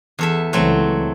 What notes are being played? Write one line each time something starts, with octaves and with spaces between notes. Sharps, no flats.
E2 A4 E5
C#2 E3 F#3 A3 C4